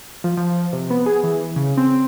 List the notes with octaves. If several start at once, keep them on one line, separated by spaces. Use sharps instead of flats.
F3
F3
C3
B3
G#4
E3
C#3
C4